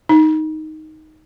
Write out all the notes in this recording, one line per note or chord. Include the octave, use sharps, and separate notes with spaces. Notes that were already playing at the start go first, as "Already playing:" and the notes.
D#4